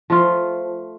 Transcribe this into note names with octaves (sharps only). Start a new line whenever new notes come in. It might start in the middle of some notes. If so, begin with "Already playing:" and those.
F3 A3 F4